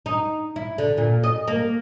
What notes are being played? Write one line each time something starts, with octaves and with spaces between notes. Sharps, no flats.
D#4
E4
D3
A#2
D#5
A#3